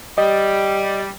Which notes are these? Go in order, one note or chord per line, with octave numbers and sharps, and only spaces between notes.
G3 D#5